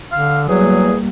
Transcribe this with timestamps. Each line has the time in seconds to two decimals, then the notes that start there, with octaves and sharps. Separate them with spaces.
0.12 D3 F5
0.49 E2 F#3 G3 A#3 G#4